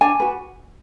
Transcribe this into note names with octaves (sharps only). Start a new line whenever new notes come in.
D4 G#5
F#4 B4